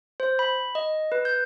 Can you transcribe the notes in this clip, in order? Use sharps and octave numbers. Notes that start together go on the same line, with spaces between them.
C5
B5
D#5
B4
G6